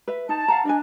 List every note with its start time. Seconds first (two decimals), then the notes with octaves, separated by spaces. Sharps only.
0.08 B4 E5
0.29 D#4 A5
0.48 F5 F#5 A#5
0.65 D4 D5 D#5 G#5